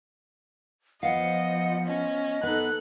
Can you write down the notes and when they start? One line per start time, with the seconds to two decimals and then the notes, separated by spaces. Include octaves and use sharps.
1.03 F3 B3 D#5 F5 F#5
1.86 C#4 D#5
2.43 B3 D#4 A4 F#6